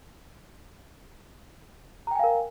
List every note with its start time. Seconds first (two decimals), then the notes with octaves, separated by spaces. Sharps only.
2.07 A#5
2.11 G5
2.15 G#5
2.19 F5
2.24 A#4